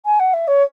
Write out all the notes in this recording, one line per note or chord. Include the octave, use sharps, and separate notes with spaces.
G#5
F#5
E5
C#5